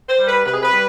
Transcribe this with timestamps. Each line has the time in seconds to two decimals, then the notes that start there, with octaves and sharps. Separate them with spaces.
0.09 C5
0.18 G3
0.27 B4
0.45 C3 B4
0.54 G#4
0.63 B4
0.71 G3